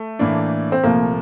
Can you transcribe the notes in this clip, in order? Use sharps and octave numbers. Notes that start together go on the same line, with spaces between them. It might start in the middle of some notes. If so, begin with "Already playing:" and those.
Already playing: A3
A2 E3 A#3 D4
C4
C2 A#2 F3 A3 A#3